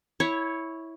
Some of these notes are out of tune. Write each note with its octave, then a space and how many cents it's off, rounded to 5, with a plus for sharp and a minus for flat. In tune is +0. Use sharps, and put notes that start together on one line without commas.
E4 -10 C#5 +0